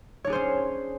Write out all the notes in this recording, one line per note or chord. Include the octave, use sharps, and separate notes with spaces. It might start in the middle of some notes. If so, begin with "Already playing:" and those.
C#4 D4 G#4 C5 C#5